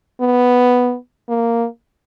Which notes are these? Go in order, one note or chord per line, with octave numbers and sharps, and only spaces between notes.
B3
A#3